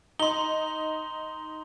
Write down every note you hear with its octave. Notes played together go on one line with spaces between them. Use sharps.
D#4 C6 G7